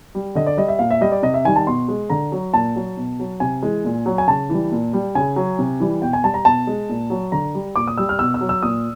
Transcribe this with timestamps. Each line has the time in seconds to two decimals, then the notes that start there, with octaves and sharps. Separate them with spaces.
0.15 G3
0.35 D3 D#5
0.46 D5
0.57 G3 D#5
0.68 E5
0.79 A#2 F5
0.91 E5
1.01 G3 D#5
1.12 D5
1.23 C3 D#5
1.34 E5
1.45 D#3 G3 G#5
1.56 A5
1.67 B2 C6
1.88 G#3
2.10 D3 A#5
2.32 F#3
2.53 A#2 A5
2.76 F#3
2.97 B2
3.19 F#3
3.40 C3 G#5
3.63 E3 G#3
3.85 A#2
4.06 F#3
4.18 G#5
4.27 C#3 A5
4.50 E3 G3
4.72 A#2
4.93 G3
5.15 C#3 G#5
5.36 F#3
5.59 C3
5.80 E3 G3
6.02 B2 G5
6.13 G#5
6.24 G3 A5
6.34 A#5
6.45 B2 A5
6.67 G#3
6.89 A#2
7.10 F#3
7.32 D3 A#5
7.55 G3
7.76 A#2 D6
7.88 D#6
7.98 G3 E6
8.09 F6
8.19 B2 E6
8.34 E6
8.41 F#3
8.49 E6
8.63 A#2 D#6